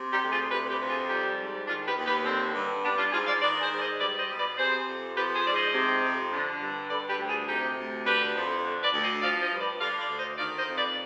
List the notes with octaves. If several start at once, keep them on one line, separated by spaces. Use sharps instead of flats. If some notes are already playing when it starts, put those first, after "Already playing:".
Already playing: C3
D#4 G4
D2
F4 G#4
C3 G4 B4
G4 B4
F2
F4 G#4
G3 D#4 G4
G#2
D#3 D4 F4
G4 B4
D#2
G4 B4
D3 C4
G2
G3 B3 D4
D4 F4
G#2 F4 G#4
D5 F5
D#3 B4 D5
G#4 C5
G#2 D5
C5 D#5
G3 B4 D5
C5 D#5
B2
B4 D5
C3 G#4 C5
F2
F3 G4 B4
G#4 C5
G#2 D5
C5 D#5
C3
F2
D3
G2
D3 B4 D5
G4 B4
D2
F4 G#4
C3 D#4 G4
D2
D3 G4 B4
F2
D3
B4 D5
D2
C5 D#5
F3 D5 F5
C5 D#5
G2
B4 D5
D3 D5 F5
D5 F5
D2
C5 D#5
D#3 D5 F5
C5 D#5
F2
B4 D5